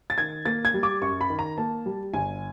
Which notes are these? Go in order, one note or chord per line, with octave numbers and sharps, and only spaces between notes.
A6
D#3 G#6
A#3 A6
G#6
G3
D6
F#2 C#6
B5
D#3
A#5
A#3 A5
G3
G1 G#5